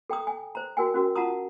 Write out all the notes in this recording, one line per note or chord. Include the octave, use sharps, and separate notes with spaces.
A4 G5 A#5 D#6
G#5
C5 A#5
F#4 A#4 G5 G#5
C#4 F#4 A#4
F4 F#5 A5 A#5 D#6